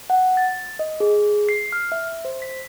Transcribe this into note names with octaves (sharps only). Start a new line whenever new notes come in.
F#5
A6
D#5
G#4
C7
F6
E5
C5
B6